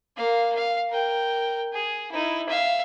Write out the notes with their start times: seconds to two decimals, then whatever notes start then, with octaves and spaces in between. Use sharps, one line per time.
0.17 A#3 F5
0.55 F5
0.90 A#4 G5
1.73 G#4
2.12 D#4 E4
2.49 E5 F5